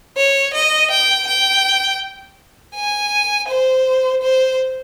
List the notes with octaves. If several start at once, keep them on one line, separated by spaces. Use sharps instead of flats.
C#5
D#5
G5
G5
G#5
C5
C5